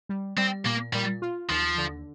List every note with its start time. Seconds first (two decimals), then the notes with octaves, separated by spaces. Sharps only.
0.09 G3
0.38 G3 C4
0.66 A#2 A#3
0.94 A#2 G3
1.22 F4
1.50 D#2 F3
1.78 D3